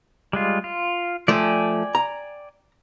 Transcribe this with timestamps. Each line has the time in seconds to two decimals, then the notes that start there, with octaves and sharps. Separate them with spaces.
0.33 G3 G#3 F4
0.64 F4
1.28 F3 A3 D5 G5 G#5
1.95 A#5